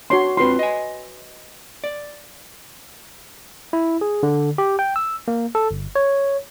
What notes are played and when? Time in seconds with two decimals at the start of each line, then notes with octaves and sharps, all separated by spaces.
0.10 D4 F#4 C#5 C6
0.37 C4 D4 F4 B4 C6
0.59 D#5 G#5
1.84 D5
3.73 E4
4.01 G#4
4.23 D3
4.58 G4
4.79 G5
4.96 E6
5.28 A#3
5.55 A4
5.71 G1
5.95 C#5